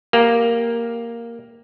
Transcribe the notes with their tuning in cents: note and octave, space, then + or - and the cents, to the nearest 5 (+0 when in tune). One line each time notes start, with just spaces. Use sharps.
A#3 +0 G4 +0